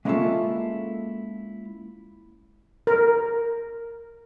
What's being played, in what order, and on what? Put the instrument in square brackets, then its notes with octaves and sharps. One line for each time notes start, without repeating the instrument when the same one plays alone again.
[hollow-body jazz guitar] G#3 A#3 C#4 E4 F4 A4
[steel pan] A#4